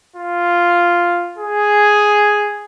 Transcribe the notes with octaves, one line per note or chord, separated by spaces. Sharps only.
F4
G#4